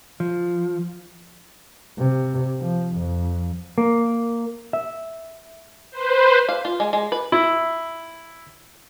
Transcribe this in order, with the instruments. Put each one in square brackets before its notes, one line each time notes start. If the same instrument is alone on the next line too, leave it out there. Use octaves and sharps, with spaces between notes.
[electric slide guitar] F3
[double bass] C3
F3
F2
[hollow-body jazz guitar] A#3
E5
[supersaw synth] B4 C5
[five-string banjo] F5
F4
G#3
G#3
B4
[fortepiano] E4